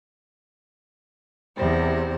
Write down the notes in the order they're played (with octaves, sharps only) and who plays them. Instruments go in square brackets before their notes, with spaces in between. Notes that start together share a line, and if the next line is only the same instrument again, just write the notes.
[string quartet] E2 C3 G3 C5